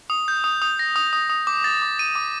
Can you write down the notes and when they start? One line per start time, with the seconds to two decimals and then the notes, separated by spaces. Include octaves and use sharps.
0.10 D#6
0.28 G6
0.44 D#6
0.62 D#6
0.79 A#6
0.96 D#6
1.13 D#6
1.30 D#6
1.47 D6
1.64 A6
1.82 D6
1.99 D#7
2.15 D6